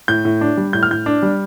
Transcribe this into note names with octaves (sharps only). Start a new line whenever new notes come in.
A2 G6
A2
D4
G3
A2 G6
F6
A2 G6
D4
G3